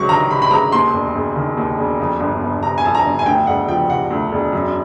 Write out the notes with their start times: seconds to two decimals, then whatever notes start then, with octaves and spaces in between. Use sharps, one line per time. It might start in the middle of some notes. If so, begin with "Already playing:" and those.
Already playing: C#2 C3 F#3 C#6
0.09 D#3 A#5
0.30 C3 B5
0.42 B5
0.51 C#2 A#5
0.72 D#2 C6
0.94 E1
1.15 E1
1.36 D#3
1.57 D#2
1.78 E1
2.00 F2
2.20 G1
2.42 G1
2.63 C3 A#5
2.78 G#5
2.84 F2 A5
2.95 A#5
3.05 G1
3.19 G#5
3.26 D2 G5
3.47 E1 F#5
3.68 F3 G5
3.90 C3 F#5
4.10 D2
4.32 E1
4.53 F#2